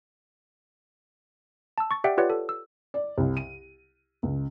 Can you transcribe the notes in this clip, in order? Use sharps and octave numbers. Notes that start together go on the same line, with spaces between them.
A5 E6
C#6 A6
G4 D5 E5 F#5 G5
F4 G4 B4 C#5 D5 F#5
A4
E6
D5
C2
D#7
C#2